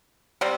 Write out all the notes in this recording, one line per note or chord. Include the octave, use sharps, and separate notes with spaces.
C3 G3 C4